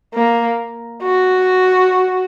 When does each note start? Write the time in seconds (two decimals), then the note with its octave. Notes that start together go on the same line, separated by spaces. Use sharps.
0.15 A#3
1.03 F#4